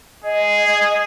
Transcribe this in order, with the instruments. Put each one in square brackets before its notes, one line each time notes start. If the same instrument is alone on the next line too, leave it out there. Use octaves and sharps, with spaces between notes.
[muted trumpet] G#4 [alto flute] D#5